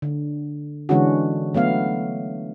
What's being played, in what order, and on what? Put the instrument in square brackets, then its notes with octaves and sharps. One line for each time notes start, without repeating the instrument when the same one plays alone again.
[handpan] D3
D3 E3 G#3 C#4 D4 F#4
F#3 A3 B3 F5